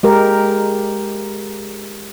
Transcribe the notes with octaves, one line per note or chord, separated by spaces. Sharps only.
G#3 G4 A#4